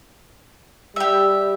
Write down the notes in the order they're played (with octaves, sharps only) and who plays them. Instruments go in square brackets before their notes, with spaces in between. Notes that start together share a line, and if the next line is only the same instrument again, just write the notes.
[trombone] G3 [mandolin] G4 E5